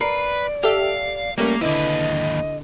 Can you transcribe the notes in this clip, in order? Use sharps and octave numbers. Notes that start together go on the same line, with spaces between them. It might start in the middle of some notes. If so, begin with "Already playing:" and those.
A#4 B4 D5 C7
G4 A4 E5 F5
G3 A3 A#3 C#4 A#4
D#2 D3 E4 B4 D#5